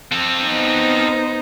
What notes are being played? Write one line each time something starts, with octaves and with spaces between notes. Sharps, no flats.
C4 A4
B3 D#4 C5